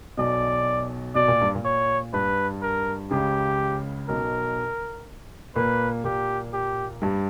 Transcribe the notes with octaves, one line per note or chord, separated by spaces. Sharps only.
B1 B2 D5
B2 D5
A#2
G2
A#2
C#5
G2 B4
A#4
C#2 C#3 G4
B1 B2 A#4
A#2 A#3 B4
A#2 A#3 G4
G4
G2 G3